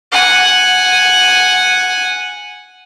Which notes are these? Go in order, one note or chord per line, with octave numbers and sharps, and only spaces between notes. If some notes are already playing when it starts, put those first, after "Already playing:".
F#5 G#5